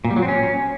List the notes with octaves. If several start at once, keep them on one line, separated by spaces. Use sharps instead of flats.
A#2
G3
F#3
C4
C#4